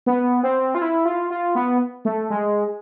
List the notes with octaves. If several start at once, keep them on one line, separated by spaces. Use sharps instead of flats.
B3
C4
F4
E4
F4
F4
B3
A3
G#3